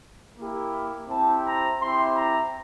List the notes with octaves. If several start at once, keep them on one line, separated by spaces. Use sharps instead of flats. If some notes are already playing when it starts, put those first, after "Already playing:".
A#3 E4 G4
C4 E4 G4 A5
A#5
C4 E4 G4 C6
A#5